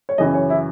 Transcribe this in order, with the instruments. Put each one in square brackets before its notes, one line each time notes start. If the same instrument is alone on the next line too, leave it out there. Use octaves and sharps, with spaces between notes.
[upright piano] C#5
F#2 C#3 E3 D#5
C#5
E4